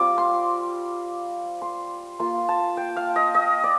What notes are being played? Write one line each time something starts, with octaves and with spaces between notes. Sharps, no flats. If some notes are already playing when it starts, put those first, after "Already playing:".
Already playing: G3 C4 F4 D6
C6
C6
A#3 F4 C6
A5
G5
F5
D#5
D#5
D5